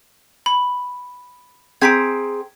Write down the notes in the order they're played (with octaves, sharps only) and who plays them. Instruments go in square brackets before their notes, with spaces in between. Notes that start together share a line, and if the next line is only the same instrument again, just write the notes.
[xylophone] B5
[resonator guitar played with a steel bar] C4 G#4 A#5 [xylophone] G#6 B6 D7